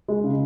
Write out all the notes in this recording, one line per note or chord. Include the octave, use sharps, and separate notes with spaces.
G#3
C#3